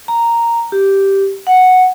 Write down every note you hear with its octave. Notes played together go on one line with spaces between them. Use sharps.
A#5
G4
F#5